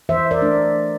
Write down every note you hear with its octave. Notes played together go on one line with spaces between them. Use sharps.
E3 C5 E5
A#4 D5
A3 D4